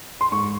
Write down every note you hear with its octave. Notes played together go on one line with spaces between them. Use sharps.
C6
G#2 C#6